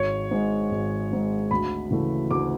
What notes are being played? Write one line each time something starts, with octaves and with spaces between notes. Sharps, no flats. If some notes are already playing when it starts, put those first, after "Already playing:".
Already playing: G#1 C#5
G#2 G#3
G#1
G#2 G#3
D2 B5
C#3 E3 A3
D2 D6